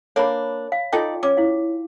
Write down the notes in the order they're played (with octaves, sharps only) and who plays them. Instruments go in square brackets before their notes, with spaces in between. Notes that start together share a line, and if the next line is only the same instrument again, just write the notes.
[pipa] A#3 D4 [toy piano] C#5 B5
[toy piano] F5
[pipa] D#4 A4 D5 [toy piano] F4 G5
[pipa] C#4 [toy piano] D6
[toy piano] E4 F5